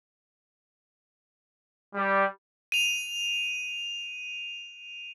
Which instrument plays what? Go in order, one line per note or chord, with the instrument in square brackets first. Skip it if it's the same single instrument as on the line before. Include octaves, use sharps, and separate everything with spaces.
[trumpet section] G3
[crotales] D#7 F7